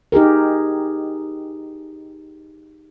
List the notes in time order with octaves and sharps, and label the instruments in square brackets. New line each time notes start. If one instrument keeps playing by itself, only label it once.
[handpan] D#4 G4 G#4 A#4